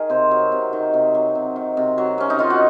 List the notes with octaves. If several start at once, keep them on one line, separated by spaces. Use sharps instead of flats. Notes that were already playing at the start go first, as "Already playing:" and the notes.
Already playing: D#3 G#4 A#4
C3 C5
F#3
C3
D#3
C3
F#3
C3
D#3
C3
F#3
C3 C#4
D#4
D#3 F4
F#4